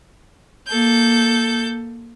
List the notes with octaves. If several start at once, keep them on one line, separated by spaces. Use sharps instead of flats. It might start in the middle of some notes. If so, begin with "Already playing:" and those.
A#3 A4 G6